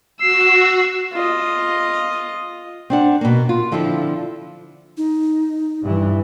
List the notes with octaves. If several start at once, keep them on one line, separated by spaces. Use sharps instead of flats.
F#4 E6 C7
F4 D#5
C4 D4 F#5
B2 A#3
F4
D3 F3 C4 E4 F4
D#4
G2 E3